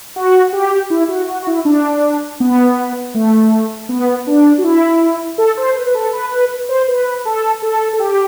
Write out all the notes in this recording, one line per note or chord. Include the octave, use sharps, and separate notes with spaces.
F#4
G4
E4
F#4
F#4
F#4
E4
D4
B3
A3
B3
D4
F#4
E4
A4
C5
B4
B4
A4
B4
B4
C5
B4
A4
A4
A4
G4